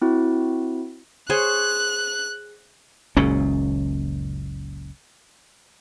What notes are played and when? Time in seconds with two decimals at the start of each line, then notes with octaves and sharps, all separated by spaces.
0.02 C4 E4 F#4
1.30 G#4 C5 C#5 F#6
3.17 F#1 C#2 A#2 C#4